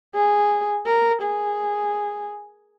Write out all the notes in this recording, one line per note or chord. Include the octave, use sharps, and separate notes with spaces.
G#4
A#4
G#4